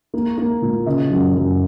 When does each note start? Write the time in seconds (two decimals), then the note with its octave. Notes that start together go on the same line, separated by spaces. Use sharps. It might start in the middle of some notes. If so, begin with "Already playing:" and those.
0.14 A#3
0.38 A#3
0.62 A#2
0.86 C#3 D#5
1.10 F#2
1.35 F#2